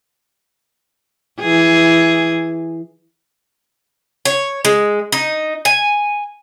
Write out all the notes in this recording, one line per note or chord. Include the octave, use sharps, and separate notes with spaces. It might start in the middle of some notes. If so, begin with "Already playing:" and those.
E3 G#4
C#5
G#3
D#4
G#5